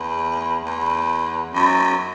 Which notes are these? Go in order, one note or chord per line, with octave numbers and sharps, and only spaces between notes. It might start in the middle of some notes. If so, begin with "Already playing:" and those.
Already playing: E2
E2
F#2